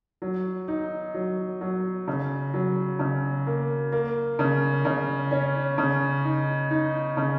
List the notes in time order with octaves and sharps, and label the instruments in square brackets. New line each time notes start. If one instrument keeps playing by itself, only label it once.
[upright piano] F#3
D#4
F#3
F#3
C#3
F#3
C#3
A#3
A#3
C#3
C#3
C#4
C#3
D#4
D#4
C#3